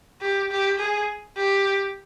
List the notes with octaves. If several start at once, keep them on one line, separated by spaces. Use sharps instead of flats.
G4
G4
G#4
G4